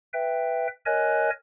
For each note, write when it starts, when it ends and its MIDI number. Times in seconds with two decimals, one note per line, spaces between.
0.14 0.68 71
0.14 0.68 76
0.14 0.68 79
0.86 1.30 70
0.86 1.30 73
0.86 1.30 75
0.86 1.30 80
0.86 1.30 90